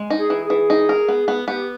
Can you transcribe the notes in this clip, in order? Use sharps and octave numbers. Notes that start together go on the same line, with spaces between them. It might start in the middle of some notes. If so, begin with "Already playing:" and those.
Already playing: G#3
D#4
G#4
E3
G#4
E3
D#4
A#4
B3
B3
B3 G4